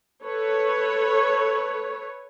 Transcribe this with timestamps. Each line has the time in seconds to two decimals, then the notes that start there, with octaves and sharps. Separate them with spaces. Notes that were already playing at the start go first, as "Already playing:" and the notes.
0.24 A4 B4 C#5